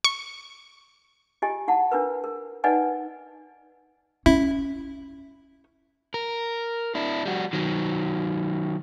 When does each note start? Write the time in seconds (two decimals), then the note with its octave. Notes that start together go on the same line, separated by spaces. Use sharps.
0.04 C#6
1.42 F4 G4 D#5 G#5
1.68 E4 F#5 A5
1.92 D4 F4 A#4 B4
2.24 A#4
2.64 D#4 B4 D5 D#5 F#5 G#5
4.26 C#4 E4
6.14 A#4
6.95 D4 E4
7.25 G3 F#4
7.53 D#3 F#3